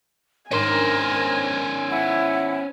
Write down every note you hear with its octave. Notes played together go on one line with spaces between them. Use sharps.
G#2 D#3 C#4 D4 A#4 C5 G#5
E4 F#5